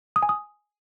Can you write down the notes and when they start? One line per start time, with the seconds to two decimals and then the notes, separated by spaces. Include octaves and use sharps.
0.16 D#6
0.22 G#5
0.29 D#6